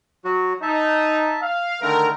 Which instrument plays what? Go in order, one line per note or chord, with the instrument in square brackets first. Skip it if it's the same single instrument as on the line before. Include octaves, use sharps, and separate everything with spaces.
[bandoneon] F#3 F#4
[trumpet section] D#4 [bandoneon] E5 A5
[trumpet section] F5
[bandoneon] D3 D#3 A3 [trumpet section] A#4